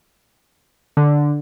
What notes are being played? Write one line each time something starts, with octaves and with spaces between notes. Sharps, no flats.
D3